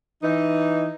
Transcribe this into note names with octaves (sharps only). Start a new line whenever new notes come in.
E3 D#4